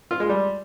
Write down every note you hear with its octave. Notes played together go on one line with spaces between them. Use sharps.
F4
G#3
G3